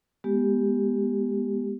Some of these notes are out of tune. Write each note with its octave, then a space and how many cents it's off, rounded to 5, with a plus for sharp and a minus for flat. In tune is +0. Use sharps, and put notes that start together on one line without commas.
G#3 +0 B3 -15 G4 +0